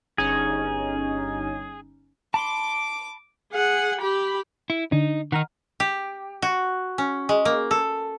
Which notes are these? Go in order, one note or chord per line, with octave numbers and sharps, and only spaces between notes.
G1 C#4 D#4 G#4
A5 B5 C6 D6
G#4 F#5
G4 B5
E4
D3 D4 D#4
D#3 D#4 F#5 A#5 F6
G4
F#4
C#4
G#3
A#3
A4